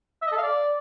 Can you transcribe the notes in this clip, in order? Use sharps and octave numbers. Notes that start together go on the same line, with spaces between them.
E5
D#5
A4
F5
D5